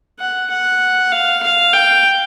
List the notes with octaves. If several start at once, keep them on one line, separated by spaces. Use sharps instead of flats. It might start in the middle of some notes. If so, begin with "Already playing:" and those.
F#5
F#5
F5
F5
G5